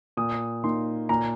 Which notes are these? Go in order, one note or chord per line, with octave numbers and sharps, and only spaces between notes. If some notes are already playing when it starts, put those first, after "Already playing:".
A#2 D#6
A#3 D#4 C6
A#2 A#5